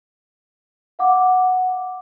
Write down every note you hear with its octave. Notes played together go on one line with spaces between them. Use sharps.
F5 F#5 D6